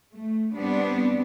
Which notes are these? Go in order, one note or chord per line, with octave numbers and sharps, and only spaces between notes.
A3
G3 B3 C4 D4